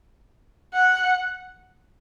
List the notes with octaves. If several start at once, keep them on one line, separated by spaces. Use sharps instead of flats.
F#5